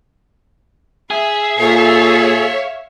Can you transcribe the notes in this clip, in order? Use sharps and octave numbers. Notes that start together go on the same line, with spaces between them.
G#4 E5
A#2 A4 C#5 E5 F5